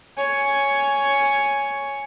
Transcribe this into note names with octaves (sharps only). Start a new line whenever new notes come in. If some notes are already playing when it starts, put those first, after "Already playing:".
C#5 G#5